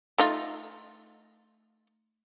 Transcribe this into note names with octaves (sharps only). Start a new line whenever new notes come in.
A3 D#4 F4